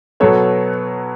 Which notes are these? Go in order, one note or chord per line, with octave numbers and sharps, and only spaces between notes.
B2 F#3 B3 A4 C#5